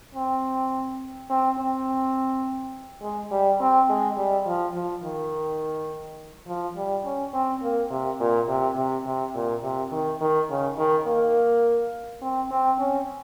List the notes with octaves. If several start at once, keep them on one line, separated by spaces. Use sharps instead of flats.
C4
C4
C4
G#3
G3
C4
G#3
G3
F3
F3
D#3
F3
G3
C#4
C4
A#3
C3
A#2
C3
C3
C3
A#2
C3
D#3
D#3
C#3
D#3
A#3
C4
C4
C#4